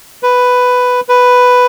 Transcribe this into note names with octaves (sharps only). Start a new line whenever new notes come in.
B4
B4